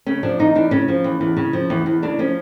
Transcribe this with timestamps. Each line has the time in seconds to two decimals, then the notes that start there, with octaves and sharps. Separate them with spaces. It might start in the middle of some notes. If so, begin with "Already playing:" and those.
0.06 C#3 C#4
0.23 F3 D4
0.39 E2 D#4
0.55 E2 D4
0.71 C#3 C#4
0.88 F3
1.04 E2
1.21 E2
1.37 C#3
1.53 F3
1.70 E2
1.86 E2
2.02 C#3 D4
2.19 F3 C#4